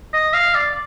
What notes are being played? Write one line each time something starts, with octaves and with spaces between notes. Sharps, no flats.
D#5
F5
D5